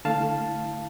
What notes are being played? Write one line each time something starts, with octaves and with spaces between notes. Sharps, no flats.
D3 A3 E4 F5 A5